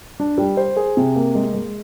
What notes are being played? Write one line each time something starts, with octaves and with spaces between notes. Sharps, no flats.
D4
G3
C5
G#4
C3
A#3
G#3
G#3